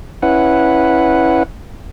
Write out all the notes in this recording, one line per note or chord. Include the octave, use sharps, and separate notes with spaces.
C#4 E4 B4 F#5